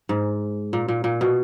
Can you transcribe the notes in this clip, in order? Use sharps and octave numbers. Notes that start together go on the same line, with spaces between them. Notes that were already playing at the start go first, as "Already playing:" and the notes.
G#2
A#2
A#2
A#2
B2